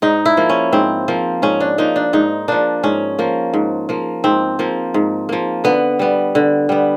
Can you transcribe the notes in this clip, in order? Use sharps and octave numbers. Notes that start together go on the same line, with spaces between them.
G#2 D#4
E4
F3 A#3
C#4
G#2 C4
F3 A#3
G#2 C#4
D4
F3 A#3 D#4
D4
G#2 D#4
F3 A#3 D4
G#2 C#4
F3 A#3
G#2
F3 A#3
G#2 C4
F3 A#3
G#2
F3 A#3
D3 B3
G3 B3
D3
G3 B3